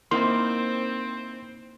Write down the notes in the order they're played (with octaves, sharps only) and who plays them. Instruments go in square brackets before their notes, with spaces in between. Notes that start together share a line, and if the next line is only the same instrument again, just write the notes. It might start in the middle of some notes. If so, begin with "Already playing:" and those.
[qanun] A#3 D#4 E4 [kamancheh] C4 C5 [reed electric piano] C6